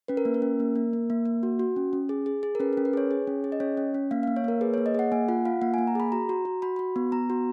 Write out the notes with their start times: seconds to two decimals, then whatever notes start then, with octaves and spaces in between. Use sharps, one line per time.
0.08 C#4 B4
0.17 A#4
0.25 A#3
0.34 A#4
0.42 C#4
0.60 A#3
0.76 A#3
0.93 A#3
1.10 A#3
1.26 A#3
1.43 F#4
1.59 F#4
1.76 C#4
1.93 C#4
2.09 G#4
2.26 G#4
2.43 G#4
2.55 A#4
2.60 C#4 B4
2.73 C#4 A#4
2.85 B4
2.93 G#4 C#5
3.11 G#4
3.27 C#4
3.44 G#4
3.52 D#5
3.60 C#4 C#5
3.77 C#4
3.94 C#4
4.11 A#3 F5
4.23 A#3 F5
4.36 C#5
4.44 A#3 A#4
4.61 G#4 B4
4.74 A#3 C#5
4.86 D#5
4.95 G#4 F#5
5.12 A#3 G#5
5.28 F4 F#5
5.45 F4 F5
5.61 A#3 F#5
5.74 A#3 G#5
5.87 A#5
5.95 G#4 B5
6.12 F#4 A#5
6.29 F#4
6.45 F#4
6.62 F#4 B5
6.76 F#4 B5
6.96 B3
7.12 B3 A#5
7.30 F#4